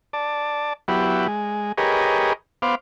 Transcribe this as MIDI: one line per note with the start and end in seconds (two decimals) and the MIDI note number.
0.13 0.73 74
0.13 0.73 81
0.88 1.27 54
0.88 1.27 59
0.88 1.27 64
0.88 1.27 67
1.28 1.72 56
1.78 2.33 67
1.78 2.33 68
1.78 2.33 70
1.78 2.33 71
1.78 2.33 73
1.78 2.33 75
2.62 2.75 59
2.62 2.75 72
2.62 2.75 77
2.62 2.75 86